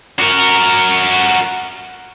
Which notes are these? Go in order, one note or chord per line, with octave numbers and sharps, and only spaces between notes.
F#4 A#4